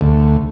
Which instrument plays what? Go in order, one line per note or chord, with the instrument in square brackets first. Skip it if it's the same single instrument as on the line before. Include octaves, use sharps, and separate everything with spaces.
[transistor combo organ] D2